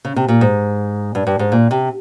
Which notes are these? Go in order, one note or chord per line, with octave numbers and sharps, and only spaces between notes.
C#3
C3
A#2
G#2
G2
G2
G#2
A#2
C3